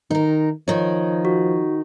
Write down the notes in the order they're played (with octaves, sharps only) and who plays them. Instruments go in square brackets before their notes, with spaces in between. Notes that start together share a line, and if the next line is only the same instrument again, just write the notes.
[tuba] D#3 [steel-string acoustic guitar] D#4 A#4
[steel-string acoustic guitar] D#3 D#4 [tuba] F3 [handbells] C#5
[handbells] F#4